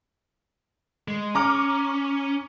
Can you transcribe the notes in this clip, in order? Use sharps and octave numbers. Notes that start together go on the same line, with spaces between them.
G#3
C#4 A#5 D6 F6